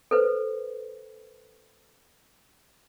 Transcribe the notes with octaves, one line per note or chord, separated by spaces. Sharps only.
A4 B4 C5